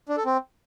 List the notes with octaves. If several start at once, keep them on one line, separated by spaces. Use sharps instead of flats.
D4
A4
C4